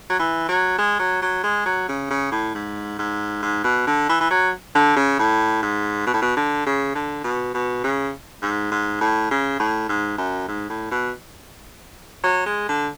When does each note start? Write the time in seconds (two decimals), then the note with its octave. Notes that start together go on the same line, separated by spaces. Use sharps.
0.10 F#3
0.19 E3
0.49 F#3
0.78 G#3
1.00 F#3
1.22 F#3
1.44 G#3
1.66 F#3
1.89 C#3
2.11 C#3
2.32 A2
2.55 G#2
2.99 G#2
3.43 G#2
3.64 B2
3.87 D3
4.09 E3
4.20 E3
4.31 F#3
4.75 D3
4.96 C#3
5.19 A2
5.63 G#2
6.07 B2
6.14 A2
6.22 B2
6.37 D3
6.66 C#3
6.95 D3
7.24 B2
7.54 B2
7.84 C#3
8.42 G#2
8.72 G#2
9.01 A2
9.31 C#3
9.60 A2
9.89 G#2
10.18 F#2
10.49 G#2
10.70 A2
10.92 B2
12.24 F#3
12.46 G#3
12.69 D3